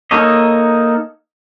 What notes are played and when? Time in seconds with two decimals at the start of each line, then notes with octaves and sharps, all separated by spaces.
0.11 A#3 D#4 A4 C#5 D#5